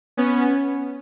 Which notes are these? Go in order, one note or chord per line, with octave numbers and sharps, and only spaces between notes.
B3 C#4